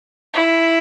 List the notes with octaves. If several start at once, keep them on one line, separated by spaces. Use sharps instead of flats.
E4